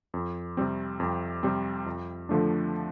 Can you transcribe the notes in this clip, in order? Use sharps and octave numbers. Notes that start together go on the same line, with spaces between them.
F2
C3 G3 C4
F2
C3 G3 C4
F2
D3 F3 A3 D4